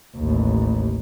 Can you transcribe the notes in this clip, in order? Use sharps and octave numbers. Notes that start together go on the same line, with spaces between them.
A1 D#2